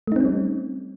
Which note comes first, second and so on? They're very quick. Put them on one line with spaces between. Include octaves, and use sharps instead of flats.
A3 D#4 C4 C#4 G3